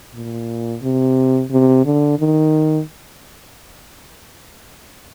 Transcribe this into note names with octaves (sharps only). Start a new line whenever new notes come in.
A#2
C3
C3
D3
D#3